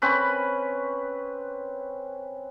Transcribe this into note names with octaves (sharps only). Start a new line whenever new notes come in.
C4 C#4 B4 B5